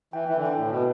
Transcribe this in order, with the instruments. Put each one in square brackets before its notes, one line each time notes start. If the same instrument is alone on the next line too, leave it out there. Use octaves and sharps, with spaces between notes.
[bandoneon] E3 [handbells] G5
[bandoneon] E3
D3
[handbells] G5
[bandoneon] A2
B2
[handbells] B4